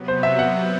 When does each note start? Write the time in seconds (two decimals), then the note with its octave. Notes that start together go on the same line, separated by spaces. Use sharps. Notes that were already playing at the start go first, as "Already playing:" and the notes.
Already playing: C3 F#3 B3
0.08 C5
0.23 E5
0.39 F#5